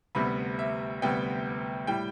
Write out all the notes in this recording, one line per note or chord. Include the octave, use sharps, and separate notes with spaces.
D2 C3 G3 B3 B5
E5
D2 C3 G3 B3 G5
A2 G3 G5